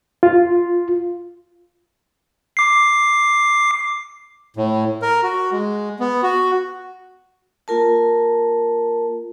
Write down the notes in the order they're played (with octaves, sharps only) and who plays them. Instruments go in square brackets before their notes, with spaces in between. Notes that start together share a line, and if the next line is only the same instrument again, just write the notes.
[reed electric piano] F4
[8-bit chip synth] D6 C7
[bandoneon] A2
A#4
F#4
G#3
B3
F#4
[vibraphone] A#3 F4 A#4 A5